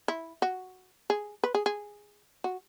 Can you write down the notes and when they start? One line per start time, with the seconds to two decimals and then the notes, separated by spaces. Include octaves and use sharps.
0.08 E4
0.42 F#4
1.10 G#4
1.44 B4
1.55 G#4
1.66 G#4
2.44 F#4